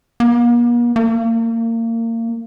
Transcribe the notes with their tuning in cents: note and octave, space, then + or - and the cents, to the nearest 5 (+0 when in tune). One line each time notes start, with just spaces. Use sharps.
A#3 +45
A#3 -30